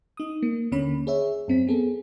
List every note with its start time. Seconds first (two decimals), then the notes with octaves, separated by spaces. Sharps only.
0.17 D#4 D#6
0.43 A#3
0.72 D#2 D3 A#3 C#4 B5
1.07 G#4 C#5 E5
1.48 F#2 C4 B6
1.67 B3 G#4 A4